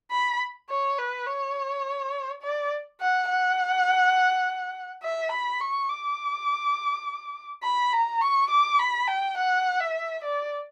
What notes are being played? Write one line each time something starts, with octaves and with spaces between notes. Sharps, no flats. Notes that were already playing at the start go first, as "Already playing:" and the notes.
B5
C#5
B4
C#5
D5
F#5
F#5
E5
B5
C#6
D6
B5
A#5
C#6
D6
B5
G5
F#5
E5
D5